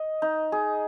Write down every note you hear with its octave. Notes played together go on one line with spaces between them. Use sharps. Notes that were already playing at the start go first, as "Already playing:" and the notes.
Already playing: D#5
D#4
G#4